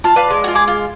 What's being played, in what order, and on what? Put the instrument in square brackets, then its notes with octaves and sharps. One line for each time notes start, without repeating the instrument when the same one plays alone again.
[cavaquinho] F4 [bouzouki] A5
[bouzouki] B4 F5 A5 [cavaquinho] D5
[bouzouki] G#3
[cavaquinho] F4 F#4
G#4 D6
F4